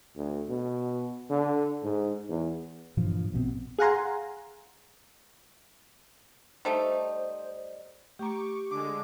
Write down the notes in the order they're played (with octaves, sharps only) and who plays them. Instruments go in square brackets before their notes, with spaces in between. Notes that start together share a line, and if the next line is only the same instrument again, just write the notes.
[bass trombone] D2
B2
D3
G#2
E2
[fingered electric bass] G2 A#2 E3 F3
A#1 B2 B3 C4
[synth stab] G#4 F5 F#5 G#5 A#5 C6
[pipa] G3 A3 D#4 [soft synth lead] C5
[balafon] A3 A#5 [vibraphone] G4 [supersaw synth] C#6 D6
[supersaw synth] D3 G#3 [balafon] D4 [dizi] D6